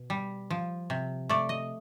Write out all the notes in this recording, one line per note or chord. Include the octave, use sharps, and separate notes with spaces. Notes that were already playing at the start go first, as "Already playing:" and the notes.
Already playing: B2
G3
F3
C3
A3 D5
D#5